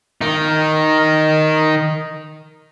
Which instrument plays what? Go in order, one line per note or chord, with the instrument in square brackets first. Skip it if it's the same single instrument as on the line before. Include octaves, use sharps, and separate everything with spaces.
[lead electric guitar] D#3 D#4